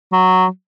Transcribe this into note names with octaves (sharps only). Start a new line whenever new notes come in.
F#3